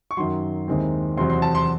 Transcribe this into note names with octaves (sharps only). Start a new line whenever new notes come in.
C#6
F#2 D#3 F#3 C6
D#2 D#3 G#3 C4 E4
E2 C3 F#3 C4 C6
C6
A5
C6